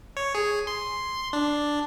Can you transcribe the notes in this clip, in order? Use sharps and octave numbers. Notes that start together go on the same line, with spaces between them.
C#5
G#4
C6
D4